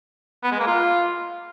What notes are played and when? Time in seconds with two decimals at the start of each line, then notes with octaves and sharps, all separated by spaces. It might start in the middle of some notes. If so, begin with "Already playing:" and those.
0.44 B3
0.51 G#3
0.59 A#3
0.67 F4